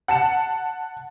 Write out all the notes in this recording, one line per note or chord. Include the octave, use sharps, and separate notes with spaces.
F#5 A5 C#7 E7